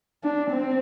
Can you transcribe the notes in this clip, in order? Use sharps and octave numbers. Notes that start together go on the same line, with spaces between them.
D4
C4